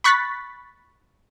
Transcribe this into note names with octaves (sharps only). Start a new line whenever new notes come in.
B5 C#6 F#6 A6 B6